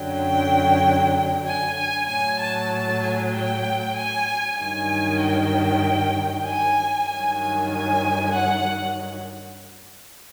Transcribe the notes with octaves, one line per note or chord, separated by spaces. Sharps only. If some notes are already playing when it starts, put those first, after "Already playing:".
Already playing: F#2 D3 F#3 G5
G#5
G#5
A2 F#3 G#5
A5
A5
G#5
G5
G#5
G2 D#3 F#3 G#5
G5
G#5
G2 D#3 F#3 G#5
G#5
G#5
F#5